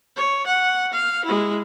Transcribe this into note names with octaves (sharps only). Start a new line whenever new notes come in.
C#5
F#5
F5
G#3 E4